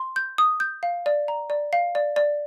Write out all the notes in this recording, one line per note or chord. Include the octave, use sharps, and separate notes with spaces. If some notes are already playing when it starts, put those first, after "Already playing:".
Already playing: C6
G6
D#6
G6
F5
D5
A#5
D5
F5
D5
D5